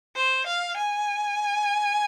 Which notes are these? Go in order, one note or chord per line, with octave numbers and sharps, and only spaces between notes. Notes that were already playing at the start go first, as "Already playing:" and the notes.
C5
F5
G#5